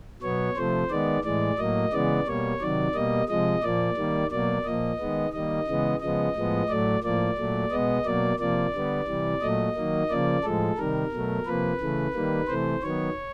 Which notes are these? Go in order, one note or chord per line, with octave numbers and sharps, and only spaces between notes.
B2 F#3 B3 C#5
C3 F3 A3 C5
D#3 G#3 B3 D5
A2 E3 G#3 D5
A2 F#3 A#3 D#5
C#3 E3 G#3 B3 D5
B2 G3 A#3 C#5
C3 D#3 F#3 D5
B2 G3 A#3 D#5
C3 F3 G#3 D#5
A#2 F3 A#3 D5
D#3 G3 A#3
B2 F#3 A#3 D5
A#2 F3 A#3 D#5
D#3 G#3 B3
D#3 G3 A#3 D#5
C#3 E3 G#3 B3
C#3 F3 G#3 B3 D#5
A2 F3 G#3 B3
A2 F#3 A3 D5
A2 F3 A#3 D5
A#2 F#3 A3
B2 G#3 B3 D#5
B2 F#3 A#3 D5
C3 F3 A#3 D5
D3 G3 B3
C3 E3 G3
A#2 F#3 A3 D#5
D#3 F#3 A#3
C#3 F3 A#3 D5
A2 F3 G#3 A4
C3 D#3 G3 A#4
B2 F#3 A3
C3 F3 A#3 B4
C#3 E3 A3
D#3 G3 A#3
C3 E3 A3 C5
D#3 F#3 B3 C#5